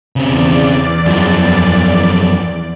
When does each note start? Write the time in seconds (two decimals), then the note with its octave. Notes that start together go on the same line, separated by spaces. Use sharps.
0.16 E2 C#3 C4 D5
1.06 F#2 F3